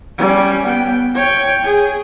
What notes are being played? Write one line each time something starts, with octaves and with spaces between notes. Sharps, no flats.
G3 C#4
B3 G5
C#5 G5
G#4